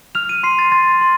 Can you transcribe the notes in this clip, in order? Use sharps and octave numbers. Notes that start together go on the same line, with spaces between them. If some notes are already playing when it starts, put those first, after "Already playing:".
F6 F7
D#7
C6 C7
A6
C6 A6
C6